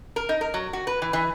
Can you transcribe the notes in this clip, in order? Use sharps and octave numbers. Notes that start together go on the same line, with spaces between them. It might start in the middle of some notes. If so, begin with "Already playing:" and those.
A#4
D#4
A#4
F#3
F#4
B4
E3
E3